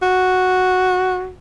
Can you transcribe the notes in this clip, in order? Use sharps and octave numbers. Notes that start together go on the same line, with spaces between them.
F#4